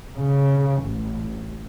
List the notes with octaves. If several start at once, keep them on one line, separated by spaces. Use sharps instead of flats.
C#3
A1